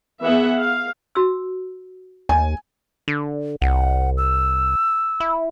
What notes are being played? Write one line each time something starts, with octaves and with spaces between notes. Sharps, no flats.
E3 B3 G#4 E5 F#5
F5
F#4 E6
D#2 G#5
D3
C2 F#5
E6
E4